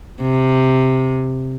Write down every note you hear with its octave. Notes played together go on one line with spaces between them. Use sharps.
C3